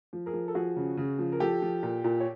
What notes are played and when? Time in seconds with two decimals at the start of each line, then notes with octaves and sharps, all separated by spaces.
0.13 F3
0.26 G#4 A#4
0.34 F3
0.48 A4
0.55 F3 F#4 G#4
0.77 C#3
0.97 C#3
1.19 F3
1.32 A#4
1.40 F3 G4 A4
1.62 F3
1.83 A#2
2.04 A#2
2.20 C#5